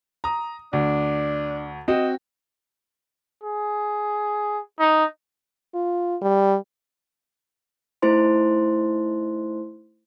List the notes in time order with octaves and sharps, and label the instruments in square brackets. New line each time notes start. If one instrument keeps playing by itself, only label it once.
[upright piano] A#5 D#6
[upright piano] D2 [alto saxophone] D4
[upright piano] C4 F#4 [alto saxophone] D#5
[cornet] G#4
D#4
[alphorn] F4
G3
[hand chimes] A3 D#4 E4 C5 C6